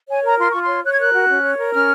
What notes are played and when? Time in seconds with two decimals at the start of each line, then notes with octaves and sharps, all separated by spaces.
0.09 C#5 G#5
0.24 A#4 A#5
0.38 F4 C6
0.50 F4 C#6
0.63 C6
0.68 C#5
0.84 C#5 F#6
0.91 G#6
0.99 A#4 F#6
1.13 F#4
1.28 C#4
1.43 C#5
1.57 A#4
1.72 C#4 F6